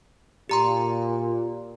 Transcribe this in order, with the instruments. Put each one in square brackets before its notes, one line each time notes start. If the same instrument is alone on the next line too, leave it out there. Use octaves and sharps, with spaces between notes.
[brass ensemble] A#2 [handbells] G4 A#5 C6